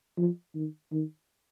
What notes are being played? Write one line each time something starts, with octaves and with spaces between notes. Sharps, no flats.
F3
D#3
D#3